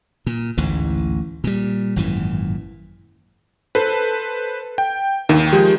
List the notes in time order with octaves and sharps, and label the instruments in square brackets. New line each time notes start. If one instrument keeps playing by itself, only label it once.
[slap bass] A#2
A1 D2 G#2 E3
A#2 G3
G#1 F#2 A#2 E3
[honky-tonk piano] A4 [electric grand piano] B4 C5
[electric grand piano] G5
[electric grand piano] D#2 [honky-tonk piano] D#3
[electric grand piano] F3 G#3 [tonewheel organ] G4